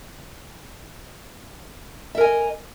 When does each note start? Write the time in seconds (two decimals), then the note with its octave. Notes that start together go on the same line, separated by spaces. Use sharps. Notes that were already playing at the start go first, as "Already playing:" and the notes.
2.15 E5
2.18 A#4
2.21 G#5
2.23 D#5